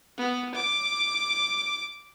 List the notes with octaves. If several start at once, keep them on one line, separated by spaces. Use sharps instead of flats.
B3
D6